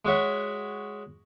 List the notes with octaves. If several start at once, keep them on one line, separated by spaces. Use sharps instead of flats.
G#3 F#4 C#5 E5